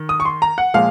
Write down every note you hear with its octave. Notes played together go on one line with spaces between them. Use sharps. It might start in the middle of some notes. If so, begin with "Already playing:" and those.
Already playing: D#3
D#6
C#6
C6
A#5
F#5
A#2 F3 G#3 F5